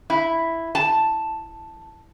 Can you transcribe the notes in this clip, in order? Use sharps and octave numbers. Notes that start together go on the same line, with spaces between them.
E4
A5